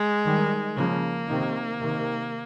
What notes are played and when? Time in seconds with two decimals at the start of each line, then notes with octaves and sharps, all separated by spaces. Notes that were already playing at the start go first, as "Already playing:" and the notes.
Already playing: G#3
0.24 D#3 G3
0.76 C#3 F3 A#3
1.29 C3 D#3
1.81 C3 D#3